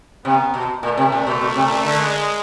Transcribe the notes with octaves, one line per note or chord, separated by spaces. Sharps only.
C3 B3
B2
A#2 A3
C3
A#2
B2
B2
C3
A#2
D3
G#3